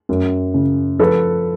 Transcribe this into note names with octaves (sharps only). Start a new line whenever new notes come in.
F#2
C#3
F3 A4 B4